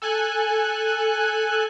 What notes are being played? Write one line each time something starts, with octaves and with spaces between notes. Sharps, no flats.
A4 G#5 F#6